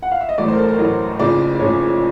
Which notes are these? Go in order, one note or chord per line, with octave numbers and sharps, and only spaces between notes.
F#5
F5
E5
D#5
A1 A2 F#3 A3 D5
C5
A#4
A4
A#4
A1 A2 F#3 A3
F#1 F2 C#3 F3 D5
F#1 F2 C#3 F3 C#5